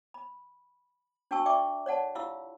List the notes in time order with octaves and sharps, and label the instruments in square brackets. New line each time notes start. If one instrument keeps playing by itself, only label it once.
[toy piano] B5
D4 F#4 G5 A5 C#6 E6
D5 E5 G5 C#6 D6
C#5 D5 F#5 A5
E4 F4 G4 F5 C6 E6